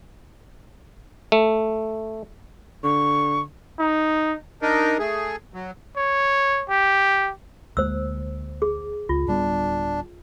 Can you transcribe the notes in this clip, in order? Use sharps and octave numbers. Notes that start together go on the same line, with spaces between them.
A3
D3 C#6
D#4
D4 D#4 A#4
A3 G#4
F#3
C#5
G4
D2 G#3 A#3 C5 E6
G#4
C#2 F4
D1 G3 B3 D4